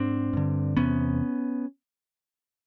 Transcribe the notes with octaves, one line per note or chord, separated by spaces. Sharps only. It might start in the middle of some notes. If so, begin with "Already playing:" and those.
Already playing: G#2 C4 D4
G2 D3
E2 C3 B3 C#4